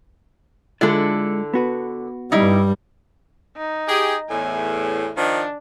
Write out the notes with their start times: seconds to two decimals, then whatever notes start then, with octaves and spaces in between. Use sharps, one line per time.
0.81 D3 G#3 E4 F4 A4 D5
1.54 B3 F#4 B4
2.32 G2 G3 D#4 E4
3.57 D#4
3.88 G4 G#4
4.30 E2 A2 G#5
5.17 D#3 F3 D4